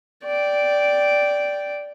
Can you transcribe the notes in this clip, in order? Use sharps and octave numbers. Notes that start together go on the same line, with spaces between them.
D5 G5